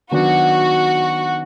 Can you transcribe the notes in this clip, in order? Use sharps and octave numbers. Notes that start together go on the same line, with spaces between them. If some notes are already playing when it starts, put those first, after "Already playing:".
D#3 F#3 B3 D4 F#4